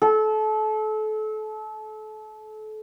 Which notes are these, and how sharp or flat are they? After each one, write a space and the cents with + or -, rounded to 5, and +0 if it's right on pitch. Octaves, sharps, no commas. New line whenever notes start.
A4 -30